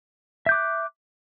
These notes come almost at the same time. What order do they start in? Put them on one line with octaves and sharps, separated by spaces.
E5 G6 D6 F#6